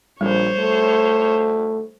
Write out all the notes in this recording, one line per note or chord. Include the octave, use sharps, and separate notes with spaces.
A#1 G3 C5 C#5
A3